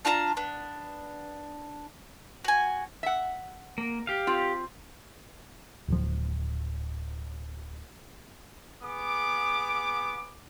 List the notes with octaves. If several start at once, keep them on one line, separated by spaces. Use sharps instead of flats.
D4 F4 A5 A#5
B3 D4
F#4 G#5
E5 F#5
A#3
G4 F5
C4 F4
D1 F3
B3 G#4 D6